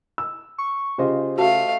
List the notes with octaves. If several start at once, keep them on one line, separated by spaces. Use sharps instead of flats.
E6
C#6
C#3 F4 G4 C5 D#5
A3 F#4 F5 A5